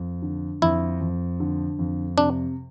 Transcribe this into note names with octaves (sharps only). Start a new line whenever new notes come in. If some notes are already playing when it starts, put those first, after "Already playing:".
Already playing: F2
D3
F2 E4
F2
D3
F2
C3 D4